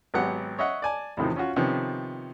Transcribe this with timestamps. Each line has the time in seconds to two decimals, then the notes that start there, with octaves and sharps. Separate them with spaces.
0.14 G#1 F#3 B3 G4 F#5
0.59 C#5 D#5 E5 F#5
0.82 D5 G#5 A5
1.17 E2 A2 C3 D#3 F3
1.36 C#4 F4 F#4
1.56 C3 D#3 F3 B3 C#4